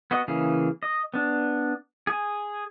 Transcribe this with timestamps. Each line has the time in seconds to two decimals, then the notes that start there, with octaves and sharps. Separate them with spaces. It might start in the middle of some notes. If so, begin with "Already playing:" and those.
0.11 B3 F#4 D#5
0.28 C#3 E3 A#3 G#4
0.83 D#5
1.14 B3 D4
2.07 G#4 G#5